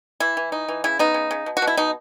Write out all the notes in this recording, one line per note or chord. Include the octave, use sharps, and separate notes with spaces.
E3 E4
E3
D#4
E3
C#3 E4
B3 D#4
C#3
C#3
B2
F#4
B2
E4
B2 D#4